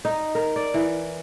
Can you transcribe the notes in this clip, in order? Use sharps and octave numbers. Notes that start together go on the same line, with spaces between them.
D#4
A#4
D5
E3